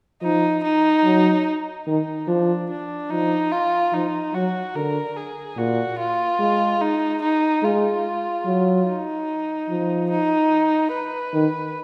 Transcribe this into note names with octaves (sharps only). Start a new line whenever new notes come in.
F3 D#4
D#4
F#3
D#3 D#4
F3 D4
D4
F3 D#4
F4
F3 D#4
F#3 F#4
D3 A#4
G#4
A#2 F#4
F4
G#3
D#4
D#4
G#3 F4
F#3
D#4
F3
D#4
B4
D#3